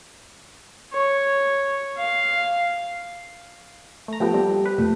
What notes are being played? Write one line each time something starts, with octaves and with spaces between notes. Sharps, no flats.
C#5
F5
A3 A#5
F3 A3 B3 G4 A4
G3 C4
B4
F2 A#2 A3